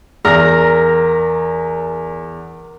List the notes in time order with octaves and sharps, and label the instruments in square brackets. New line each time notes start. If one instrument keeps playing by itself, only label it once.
[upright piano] E2 A#6 [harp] A#4